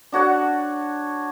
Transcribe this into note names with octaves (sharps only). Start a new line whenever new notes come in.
D4 F#4 C#5 F#5